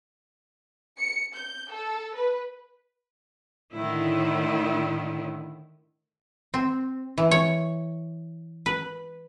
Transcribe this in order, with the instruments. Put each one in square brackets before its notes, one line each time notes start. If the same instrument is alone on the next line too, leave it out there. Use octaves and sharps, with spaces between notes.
[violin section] C#7
G6
A4
B4
[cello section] A2 D3 D#3 E4
[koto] C4
E3
C#5
B4